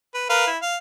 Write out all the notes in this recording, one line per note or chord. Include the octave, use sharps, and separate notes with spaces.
B4
A#4 B4 F5
E4
F5